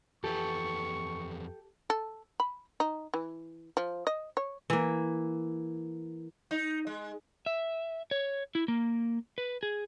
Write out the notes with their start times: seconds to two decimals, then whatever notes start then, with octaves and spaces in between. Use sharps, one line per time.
0.24 F2 E3 G4 A4 B4 C#6
1.90 A4
2.40 B5
2.80 D#4
3.14 E3
3.77 F3
4.07 D#5
4.37 C#5
4.70 E3 A#3
6.51 D#4
6.87 G#3
7.46 E5
8.11 C#5
8.55 E4
8.68 A#3
9.38 B4
9.63 G#4